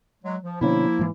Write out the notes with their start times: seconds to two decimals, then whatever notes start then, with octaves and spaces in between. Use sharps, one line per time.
0.24 F#3 G#3
0.43 F3
0.61 B2 D3 F3 A#3 C#4 E4
0.99 G#2 E3